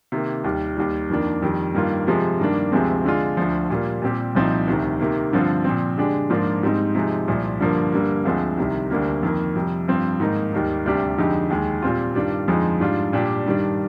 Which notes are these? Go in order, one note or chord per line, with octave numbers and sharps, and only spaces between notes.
C3 D#3 A#3
D#2 D#3 G3
D#2 D#3 G3
F2 D#3 A#3 D4
F2 D#3 G3
G2 D#3 A#3 F4
C3 F3 G#3
G2 D#3 A#3 D4
D2 C3 F3 G#3 C4
D3 G#3 D4 F4
D2 D3 F3
A#2 G3 A#3 F4
A#2 G3 C4 G4
C2 A#2 F3 C4 D#4
D2 C3 D#3
C3 D#3 A#3
G2 D3 F3 C4 F4
A#2 F3 C4
D3 G#3 D4 G4
G#2 F3 A#3 D4 F4
G#2 G3 C4 D#4
C3 F3 G#3 D#4
C2 A#2 F3
G2 D3 F3 A#3
G2 D3 G3 A#3
D2 D3 F3 G#3 C4
C2 C3 D#3
D2 D3 G3 A#3
F2 D#3 A#3
F2 C3 G3
G2 F3 C4
G#2 D#3 A#3 D#4
D#2 D#3 G3 A#3 D#4
D2 C3 G3 D4 G4
F2 D3 G#3 D#4 G4
D#2 D#3 G#3
A#2 G3 C4 F4
G2 D#3 G3 D4 F4
F2 D3 F3 G#3 D#4
G#2 G3 D4 F4
A#2 G3 D4 G4
G2 D#3 G3 D4